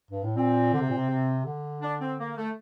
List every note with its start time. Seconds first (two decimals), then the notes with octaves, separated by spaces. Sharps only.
0.11 G2
0.23 A2
0.37 A#2 C4
0.73 D3
0.81 C3
0.89 A#2
0.97 C3
1.09 C3
1.45 D3
1.82 D4
2.01 C4
2.19 A#3
2.37 A3